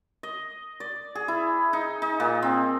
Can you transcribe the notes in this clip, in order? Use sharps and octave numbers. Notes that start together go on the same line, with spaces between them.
D#5
D5
G#4
E4
D#4
D#4
A#2
C4